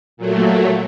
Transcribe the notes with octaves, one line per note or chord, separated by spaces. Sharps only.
A#2 F#3 A3